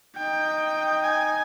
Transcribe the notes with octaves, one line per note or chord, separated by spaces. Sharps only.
D#4 G5
G#5